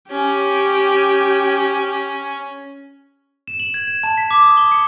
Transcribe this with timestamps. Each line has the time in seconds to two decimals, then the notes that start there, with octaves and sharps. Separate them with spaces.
0.11 C#4 G4
3.48 E7
3.60 F#7
3.74 G#6
3.87 E7
4.03 A5
4.18 B6
4.31 D6
4.43 D#6
4.57 G7
4.72 C#7